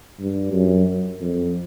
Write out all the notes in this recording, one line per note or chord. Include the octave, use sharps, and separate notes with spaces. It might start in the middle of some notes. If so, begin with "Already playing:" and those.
G2
F#2
F2